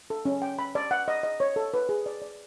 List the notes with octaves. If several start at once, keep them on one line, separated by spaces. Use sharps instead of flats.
A4
C#4
G5
B5
D5
F#5
D#5
D#5
C#5
A4
B4
G#4
D5
D5